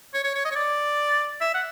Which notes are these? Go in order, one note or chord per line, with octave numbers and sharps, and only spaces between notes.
C#5
C#5
C#5
D#5
C#5
D5
E5
F#5